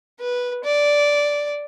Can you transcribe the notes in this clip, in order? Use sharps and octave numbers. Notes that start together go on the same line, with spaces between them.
B4
D5